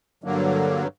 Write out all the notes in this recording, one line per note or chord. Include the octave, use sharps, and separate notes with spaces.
G2 D3 F#3 A#3